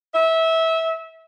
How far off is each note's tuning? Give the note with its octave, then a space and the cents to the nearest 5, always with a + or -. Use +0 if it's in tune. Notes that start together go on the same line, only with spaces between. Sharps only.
E5 -20